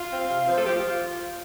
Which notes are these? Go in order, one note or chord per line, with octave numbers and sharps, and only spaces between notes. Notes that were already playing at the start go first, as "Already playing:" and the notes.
Already playing: F4 F5
C4
C3
F3 C4 C5
A3 A4
F3 G4
F4